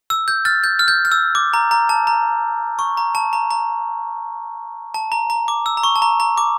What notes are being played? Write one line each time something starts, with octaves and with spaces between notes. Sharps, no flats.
E6
G6
F6 A6
G6
F6
G6
F6
E6
D6
A#5
A#5
A5
A#5
C#6
A#5
A5
A#5
A#5
A5
A#5
A#5
D6
E6
A#5
C#6
A5
A#5
A#5
D6